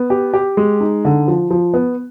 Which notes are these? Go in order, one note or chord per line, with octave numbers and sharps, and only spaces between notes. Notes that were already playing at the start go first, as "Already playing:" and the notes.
Already playing: B3
G4
G4
G#3
D#4
D3
F3
F3
B3